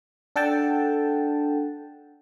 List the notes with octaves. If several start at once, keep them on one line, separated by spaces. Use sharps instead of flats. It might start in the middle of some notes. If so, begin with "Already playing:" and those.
D4 A4 F#5 G5 A5